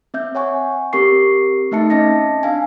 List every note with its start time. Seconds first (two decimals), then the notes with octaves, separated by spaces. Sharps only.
0.14 C4 E5 G6
0.35 C#5 F#5 G#5 C#6
0.93 C4 G4 A#4 C#6 C7
1.71 A3 D#4 E5 A5 C#7
1.90 C4 C#4 D#5 A5 A#6
2.43 D4 F5 G#5